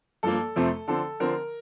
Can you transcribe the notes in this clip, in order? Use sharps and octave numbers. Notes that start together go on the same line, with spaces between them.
G2 F3 A#3 A4
F2 C3 F3 A3 C4
D3 F3 C4 A4
D3 F3 C4 A#4